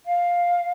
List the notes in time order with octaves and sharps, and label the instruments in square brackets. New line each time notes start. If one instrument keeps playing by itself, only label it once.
[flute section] F5